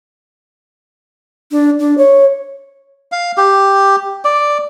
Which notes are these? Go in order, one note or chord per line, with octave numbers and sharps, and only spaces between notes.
D4
D4
C#5
F5
G4
D5